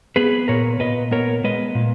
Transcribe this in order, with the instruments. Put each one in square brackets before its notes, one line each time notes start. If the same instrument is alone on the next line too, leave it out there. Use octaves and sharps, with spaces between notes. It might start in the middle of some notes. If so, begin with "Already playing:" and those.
[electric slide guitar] B3 G#4 B4
A#2 A#4 C#5
A#2 B4 D#5
B3 A#4 C#5
G#3 B4 D#5
A#2